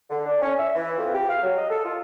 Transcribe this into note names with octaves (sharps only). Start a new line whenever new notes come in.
D3
D4
C#4
E5
E3
F2
G4
F5
F#3
D#5
A4
F4